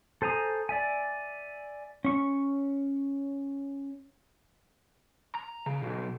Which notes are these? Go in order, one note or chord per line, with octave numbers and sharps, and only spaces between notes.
A4 C5 G#5 A#5 D#6
D5 E5 G#5
C#4 C#6
A#5
C#3
B1